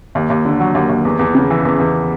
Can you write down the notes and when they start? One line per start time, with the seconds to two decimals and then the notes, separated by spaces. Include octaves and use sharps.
0.15 D#2
0.30 D#2
0.45 D3
0.60 F#3
0.75 D#2
0.89 D#2
1.05 E2
1.19 E2
1.35 C#3
1.50 E3
1.65 E2
1.80 E2